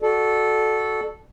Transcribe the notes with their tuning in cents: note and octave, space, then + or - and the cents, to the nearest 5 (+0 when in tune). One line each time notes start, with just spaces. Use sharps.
F#4 +0 A4 -10 D5 +35